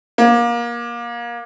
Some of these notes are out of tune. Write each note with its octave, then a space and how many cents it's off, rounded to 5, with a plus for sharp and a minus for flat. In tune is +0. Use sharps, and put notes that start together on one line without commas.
A#3 +25